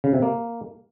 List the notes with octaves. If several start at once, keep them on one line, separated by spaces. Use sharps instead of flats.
C#3
C3
A#3